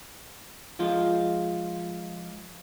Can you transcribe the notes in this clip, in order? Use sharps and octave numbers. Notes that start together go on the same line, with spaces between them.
F3 G#3 F4